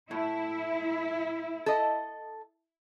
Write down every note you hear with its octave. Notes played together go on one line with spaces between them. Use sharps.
A2 E4
A4 D#5